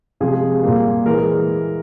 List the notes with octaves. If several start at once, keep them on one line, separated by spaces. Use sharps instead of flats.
C3 F3 G#3 G#4
A#2 G3 A#3
E3 G#3 A#4